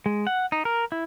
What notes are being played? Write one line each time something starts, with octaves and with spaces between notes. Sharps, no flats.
G#3
F#5
D#4
A#4
E4